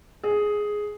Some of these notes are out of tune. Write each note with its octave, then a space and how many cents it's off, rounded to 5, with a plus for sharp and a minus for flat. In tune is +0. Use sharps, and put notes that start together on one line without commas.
G#4 +5